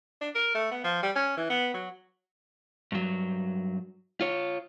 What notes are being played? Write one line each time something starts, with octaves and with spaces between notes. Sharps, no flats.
D4
A#4
A3
B3
F3
G3
C#4
E3
B3
F#3
G2 F#3
F4 C#5